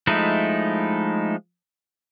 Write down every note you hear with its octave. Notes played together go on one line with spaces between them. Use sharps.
F3 G#3 A3 D#4 E4